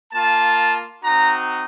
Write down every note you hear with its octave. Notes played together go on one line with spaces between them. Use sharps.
A#3 F4 A5
C4 D#4 F#4 A#5